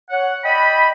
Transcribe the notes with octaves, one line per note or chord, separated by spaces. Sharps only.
C#5 F#5
D5 D#5 G5 B5